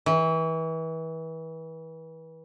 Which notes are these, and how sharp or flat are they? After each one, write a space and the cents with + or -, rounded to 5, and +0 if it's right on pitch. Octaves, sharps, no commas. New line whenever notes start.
E3 -30